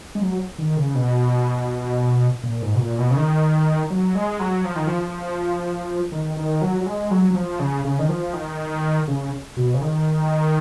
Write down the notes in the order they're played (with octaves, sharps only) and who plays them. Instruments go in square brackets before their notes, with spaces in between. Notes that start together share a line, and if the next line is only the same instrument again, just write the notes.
[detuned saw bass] G#3
F#3
D#3
C#3
B2
A#2
G#2
B2
A#2
B2
C#3
D#3
F#3
G#3
F#3
F3
D#3
F3
D#3
D#3
F#3
F#3
G#3
F#3
F#3
F3
C#3
C#3
D#3
F3
D#3
C#3
B2
C#3
D#3